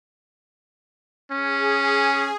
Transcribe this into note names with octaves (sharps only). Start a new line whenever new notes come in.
C#4 G#4